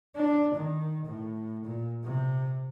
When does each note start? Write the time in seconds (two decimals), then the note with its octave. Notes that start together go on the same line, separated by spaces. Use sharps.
0.15 D4
0.54 D#3
1.06 A2
1.65 A#2
2.03 C3